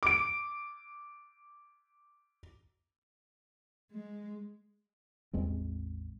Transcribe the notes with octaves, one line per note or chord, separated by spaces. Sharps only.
D6 D7
G#3
A1 E2 G#3 C4